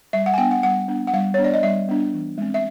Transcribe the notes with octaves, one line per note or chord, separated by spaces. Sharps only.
G3 E5
F#5
G#5
B3 D4 G5
F#5
G3 F#5
B3 D4
F#5
G3 F5
B3 D4 C#5
D5
D#5
G3 E5
B3 D4
E3
G#3 C4
E5